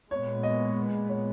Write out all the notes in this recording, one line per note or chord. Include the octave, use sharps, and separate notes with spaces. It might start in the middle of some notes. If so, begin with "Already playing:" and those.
A#2 G#3 B3 C#5
D#5
C#5